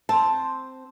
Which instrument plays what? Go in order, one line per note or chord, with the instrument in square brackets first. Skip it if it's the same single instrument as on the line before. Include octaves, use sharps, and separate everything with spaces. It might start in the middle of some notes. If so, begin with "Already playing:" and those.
[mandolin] C4 C5 [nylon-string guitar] A5